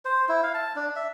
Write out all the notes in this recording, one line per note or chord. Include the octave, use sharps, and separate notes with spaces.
C5
E4
F5
A5
D4
E5